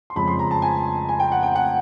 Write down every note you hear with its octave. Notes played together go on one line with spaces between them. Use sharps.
C6
F2 C#3 F3 G#3 B5
C6
A#5
A5
G#5
G#5
G5
F#5
G5
F#5